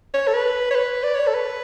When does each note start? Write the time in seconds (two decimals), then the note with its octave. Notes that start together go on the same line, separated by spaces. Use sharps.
0.14 C#5
0.27 A4
0.34 B4
0.71 C#5
0.75 B4
1.03 D5
1.15 C#5
1.27 A4
1.35 B4